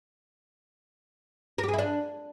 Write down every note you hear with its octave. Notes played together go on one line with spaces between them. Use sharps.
A#4
G4
G#4
E4
D4